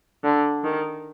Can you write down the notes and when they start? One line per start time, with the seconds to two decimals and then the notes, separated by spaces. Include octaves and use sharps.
0.24 D3
0.64 D#3